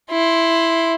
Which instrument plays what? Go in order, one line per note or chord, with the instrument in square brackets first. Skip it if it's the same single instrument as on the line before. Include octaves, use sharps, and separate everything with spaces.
[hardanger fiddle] E4 C6